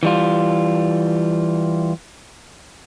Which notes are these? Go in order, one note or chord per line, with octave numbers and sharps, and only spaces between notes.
E3 G3 F4